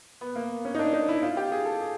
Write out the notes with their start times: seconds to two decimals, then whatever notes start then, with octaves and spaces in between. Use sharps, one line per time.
0.21 B3
0.36 A#3
0.65 C#4
0.75 D#4
0.79 D4
0.93 D#4
1.09 E4
1.23 F4
1.37 G4
1.52 G#4
1.66 A4
1.81 G#4